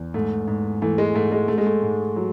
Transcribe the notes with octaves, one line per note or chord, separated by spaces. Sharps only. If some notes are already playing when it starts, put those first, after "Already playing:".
Already playing: E2
G#2 A3
G#2
E3 A3
G#3
G#2 A3
G#3
G#2 A3
G#3
A3
G#2
F#3